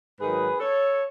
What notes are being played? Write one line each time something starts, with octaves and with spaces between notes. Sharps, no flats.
G#2 D#3 F#3 G#4 B4
A4 C#5